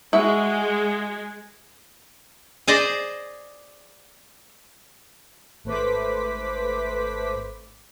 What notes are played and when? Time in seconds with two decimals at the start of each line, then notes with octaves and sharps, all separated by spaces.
0.13 G#3 E4 F#4 E5
2.67 G#4 C5 D5 D#5
5.64 G#1 A3 B4 C5 D6 B6